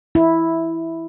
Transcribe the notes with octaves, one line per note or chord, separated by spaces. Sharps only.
E4